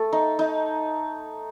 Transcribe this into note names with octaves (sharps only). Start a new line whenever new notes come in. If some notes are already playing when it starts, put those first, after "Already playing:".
Already playing: A3 A4
D#4
D#4